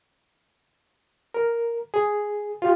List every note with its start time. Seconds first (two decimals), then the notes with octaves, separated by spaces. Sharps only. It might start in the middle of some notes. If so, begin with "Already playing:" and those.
1.34 A#4
1.94 G#4
2.62 F4 G4